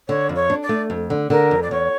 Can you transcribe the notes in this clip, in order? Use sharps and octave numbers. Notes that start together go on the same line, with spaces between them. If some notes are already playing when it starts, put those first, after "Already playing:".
D3 C#5
F2
C#5
D4
D5
A3
F2
D3
D3 A#4
F2
D5
E2 C#5